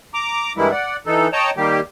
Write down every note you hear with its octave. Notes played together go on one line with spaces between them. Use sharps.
A#5 D6
G2 E3 G3 G#3 A#3 E4
D5 F#5
E3 D#4 A4
C#5 D#5 G5 A5 A#5
D#3 G3 A#3 G4